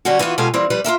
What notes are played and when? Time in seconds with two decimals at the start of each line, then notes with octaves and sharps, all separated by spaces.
0.05 D3 F#3 G3 C#4 F#4
0.19 E3 B3 D#4 F4 F#4
0.38 B2 G#3 F4 G4 A4 G#5
0.54 E3 G3 A#3 C4
0.70 F3 G3 B4
0.84 F4 G#4 A#4 E5